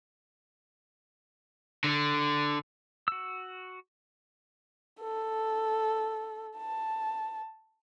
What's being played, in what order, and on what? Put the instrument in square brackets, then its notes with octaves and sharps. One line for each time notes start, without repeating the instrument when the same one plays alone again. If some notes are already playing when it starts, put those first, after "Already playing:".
[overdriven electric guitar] D3
[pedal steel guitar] F#4 E6
[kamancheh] A4
A5